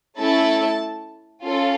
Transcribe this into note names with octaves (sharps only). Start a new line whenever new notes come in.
A3 C#4 E4 A4 A5
C#4 F4 A4